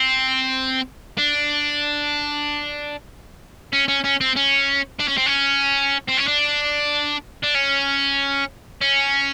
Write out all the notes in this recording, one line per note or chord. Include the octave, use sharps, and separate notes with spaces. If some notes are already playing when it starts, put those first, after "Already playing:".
Already playing: C4
D4
C#4
C#4
C#4
C4
C#4
D4
C#4
C4
C#4
C4
C#4
D4
D4
C#4
C#4